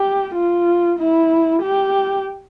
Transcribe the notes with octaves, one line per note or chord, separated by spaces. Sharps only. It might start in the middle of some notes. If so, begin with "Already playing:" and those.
Already playing: G4
F4
E4
G4